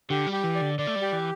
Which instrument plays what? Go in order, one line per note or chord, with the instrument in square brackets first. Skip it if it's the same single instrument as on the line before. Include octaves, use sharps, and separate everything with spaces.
[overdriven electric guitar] D3 [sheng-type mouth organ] G4
[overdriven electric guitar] G3
[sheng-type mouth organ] G4
[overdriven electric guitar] E3
[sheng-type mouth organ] D5
[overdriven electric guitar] D3
[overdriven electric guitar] D3 [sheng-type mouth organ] D5
[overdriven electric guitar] A3
G3
[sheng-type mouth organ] G4
[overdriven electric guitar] E3